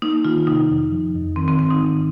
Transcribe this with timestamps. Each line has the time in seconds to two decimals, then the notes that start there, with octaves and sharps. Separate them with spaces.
0.02 A#3 D#4
0.25 D#3 F4
0.47 C3 D#4
0.69 F2
0.92 F3
1.15 F2
1.36 D#3 C4
1.48 C4
1.59 G#2 C4
1.70 D#4
1.82 D#3